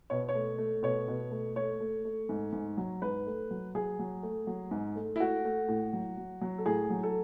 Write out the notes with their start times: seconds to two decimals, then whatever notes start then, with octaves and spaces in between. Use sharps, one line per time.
0.10 B2 C#5
0.29 C#5
0.35 A3
0.58 A3
0.83 B2 C#5
1.08 B2
1.31 A3
1.56 A3 C#5
1.80 A3
2.05 A3
2.29 G#2
2.53 G#2
2.77 F#3
3.02 G#2 B4
3.26 A3
3.51 F#3
3.75 F#3 G#4
3.99 F#3
4.23 A3
4.47 F#3
4.71 G#2
4.96 A3
5.16 E4
5.20 A3 F#4
5.45 A3
5.68 A2
5.93 F#3
6.17 F#3
6.41 F#3
6.58 A4
6.66 A2 G#4
6.90 F#3
7.03 A4